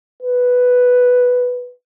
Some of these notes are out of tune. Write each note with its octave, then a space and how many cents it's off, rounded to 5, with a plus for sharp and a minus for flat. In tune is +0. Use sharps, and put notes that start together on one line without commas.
B4 +0